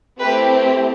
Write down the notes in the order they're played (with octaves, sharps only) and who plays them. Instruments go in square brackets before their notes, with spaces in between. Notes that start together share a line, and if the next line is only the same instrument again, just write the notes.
[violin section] A3 C4 E4 G4 B4